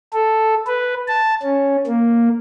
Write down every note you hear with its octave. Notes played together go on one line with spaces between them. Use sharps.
A4
B4
A5
C#4
A#3